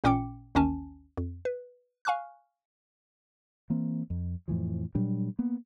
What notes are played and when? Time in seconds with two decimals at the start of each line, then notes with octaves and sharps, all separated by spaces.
0.04 A1 A#2 C#4 G5 D6 C#7
0.55 A1 D#2 D#3 C#4 G#5 A5
1.17 F2
1.45 B4
2.05 F5 G#5 C#6 F6 F#6
3.70 E3 A#3 C4
4.10 F2
4.48 F2 A2 E3 F3
4.95 A#2 F#3 G3 D4
5.39 A#3 B3